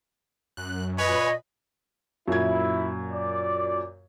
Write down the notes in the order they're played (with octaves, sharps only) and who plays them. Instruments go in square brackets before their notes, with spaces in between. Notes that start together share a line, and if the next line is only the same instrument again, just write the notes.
[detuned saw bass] F#2 [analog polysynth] F#6
[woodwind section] A#2 D#5 [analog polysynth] B4 G#5 B5 [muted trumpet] C#5
[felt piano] F#2 A#2 G#6 [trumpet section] E4
[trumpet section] D5